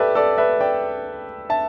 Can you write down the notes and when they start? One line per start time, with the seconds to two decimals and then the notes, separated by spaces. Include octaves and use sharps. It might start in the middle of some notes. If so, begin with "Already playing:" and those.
Already playing: G4 A4 B4 D5 E5
0.15 A4 D5
0.38 B4 E5
0.61 D5 G5
1.50 E5 A5